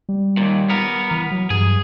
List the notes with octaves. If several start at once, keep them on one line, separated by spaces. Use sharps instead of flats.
G3
D#2 A#2
B3 A#4
E3
F#3
G2 G#4